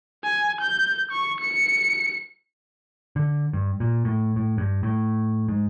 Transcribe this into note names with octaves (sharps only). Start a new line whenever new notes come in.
G#5
G6
C#6
C#7
D3
G2
A#2
A2
A2
G2
A2
G#2